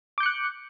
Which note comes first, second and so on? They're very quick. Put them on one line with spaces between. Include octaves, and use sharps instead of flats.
D6 G6 C#7 F#6